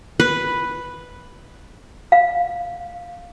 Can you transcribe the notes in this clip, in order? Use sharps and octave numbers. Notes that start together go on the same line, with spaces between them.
B4
F5